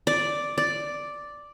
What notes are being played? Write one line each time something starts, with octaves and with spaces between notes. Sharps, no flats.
D5
D5